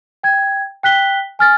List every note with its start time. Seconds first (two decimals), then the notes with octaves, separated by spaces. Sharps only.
0.23 G5 G#6
0.83 G5 F#6 B6 G7
1.39 G#5 F6 A6